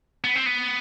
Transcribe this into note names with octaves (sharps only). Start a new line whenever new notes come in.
B3
C4
B3